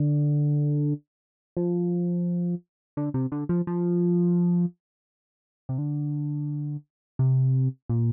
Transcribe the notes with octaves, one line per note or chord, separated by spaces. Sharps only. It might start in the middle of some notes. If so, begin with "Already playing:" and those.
Already playing: D3
F3
D3
C3
D3
F3
F3
C3
D3
C3
A#2